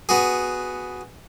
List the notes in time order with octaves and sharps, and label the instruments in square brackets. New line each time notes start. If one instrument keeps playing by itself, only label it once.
[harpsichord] B3 F#4 G#4